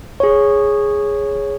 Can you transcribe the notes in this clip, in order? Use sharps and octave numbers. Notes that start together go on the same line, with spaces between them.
G#4 C#5